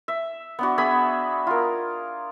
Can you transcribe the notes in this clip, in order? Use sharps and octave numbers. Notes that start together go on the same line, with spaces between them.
E5
B3 D4 F#4
B3 G#4 E5 B5
F4 A#4